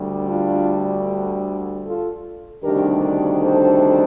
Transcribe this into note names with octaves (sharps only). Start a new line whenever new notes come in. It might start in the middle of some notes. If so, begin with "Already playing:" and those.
Already playing: D2 D3 G3
D4 F4
F4 A4
D2 C3 D#3 G3 D4 G4 A#4
A4 C5